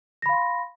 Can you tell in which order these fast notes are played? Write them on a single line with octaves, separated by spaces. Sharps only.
A#6 B5 F5 C6